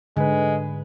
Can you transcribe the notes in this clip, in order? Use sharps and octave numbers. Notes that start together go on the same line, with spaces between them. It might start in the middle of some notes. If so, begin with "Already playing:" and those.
G#2 D3 G#3 B4